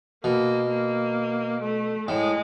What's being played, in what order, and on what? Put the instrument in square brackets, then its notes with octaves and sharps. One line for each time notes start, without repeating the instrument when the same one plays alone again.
[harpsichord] B2 [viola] A#3
[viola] A#3
A3
[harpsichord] A2 [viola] G#3